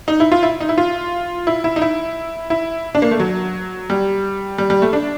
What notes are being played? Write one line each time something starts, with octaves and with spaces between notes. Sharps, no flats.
D#4
E4
F4
E4
D#4
E4
F4
E4
E4
D#4
E4
E4
D4
A#3
A3
F#3
G3
G3
G3
A3
D4